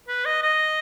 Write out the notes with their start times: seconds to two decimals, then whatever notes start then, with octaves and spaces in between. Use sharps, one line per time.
0.08 B4
0.25 D#5
0.43 D#5